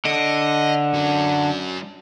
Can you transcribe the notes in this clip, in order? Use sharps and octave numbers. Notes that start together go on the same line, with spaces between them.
D3 D#5
F#3 C#4